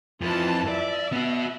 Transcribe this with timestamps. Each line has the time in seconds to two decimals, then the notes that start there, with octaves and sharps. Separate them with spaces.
0.21 F2 E3 F4 A5
0.68 D5 E5
1.13 B3 F#4